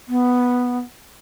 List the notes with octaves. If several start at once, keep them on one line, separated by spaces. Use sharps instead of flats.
B3